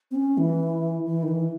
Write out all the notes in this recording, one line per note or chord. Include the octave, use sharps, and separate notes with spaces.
C4
C#4
E3
E3
D#3
E3